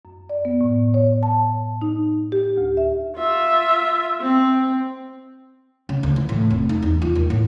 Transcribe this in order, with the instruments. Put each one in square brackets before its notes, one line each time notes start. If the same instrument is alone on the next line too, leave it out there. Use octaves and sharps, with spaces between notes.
[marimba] F#2
D5
B3
A2
C#5
A5
D#4
G4
D2
E5
[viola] F4 E5
C4
[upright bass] C#3
D2
E3
A2
F1
D#4
E2
F4
D#2
A2